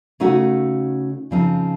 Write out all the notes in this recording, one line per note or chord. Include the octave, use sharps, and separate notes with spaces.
C#3 A3 D#4 F#4
C#3 F3 C4 D#4